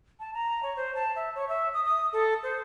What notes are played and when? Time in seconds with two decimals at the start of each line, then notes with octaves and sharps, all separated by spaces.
0.20 A5
0.34 A#5
0.63 C#5
0.76 C5
0.95 A5
1.16 E5
1.35 C#5
1.49 E5
1.74 D#6
1.85 D#6
2.13 A4
2.43 C5